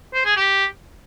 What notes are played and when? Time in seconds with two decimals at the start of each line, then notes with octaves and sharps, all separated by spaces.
0.14 C5
0.25 G#4
0.36 G4